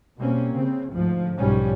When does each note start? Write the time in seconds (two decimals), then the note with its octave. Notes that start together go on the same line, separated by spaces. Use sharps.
0.18 B2 G3 A#3 C4 C#4
0.52 C#3 C4
0.93 D2 G#2 F3
1.36 B1 G#2 F3 G3 C#4